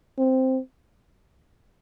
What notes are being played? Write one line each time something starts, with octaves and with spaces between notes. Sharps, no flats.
C4